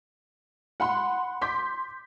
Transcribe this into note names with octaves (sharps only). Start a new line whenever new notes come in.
F#5 B5 C6
C6 D6 G6 B6